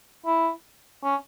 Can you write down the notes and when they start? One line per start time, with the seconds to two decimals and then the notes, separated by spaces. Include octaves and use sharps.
0.26 E4
1.04 C#4